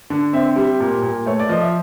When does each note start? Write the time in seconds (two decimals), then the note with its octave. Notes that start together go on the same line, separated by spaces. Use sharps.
0.10 D3
0.33 C4 E5
0.56 G3
0.80 A#2
1.02 A#2
1.26 A3 C#5
1.40 D5
1.49 F3 D#5
1.61 E5